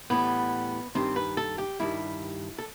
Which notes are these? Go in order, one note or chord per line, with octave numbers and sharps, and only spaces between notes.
A2 E3 G3 B3
G2 D#3 G3 C4
B4
A4
G4
G2 D#3 G3 E4
A4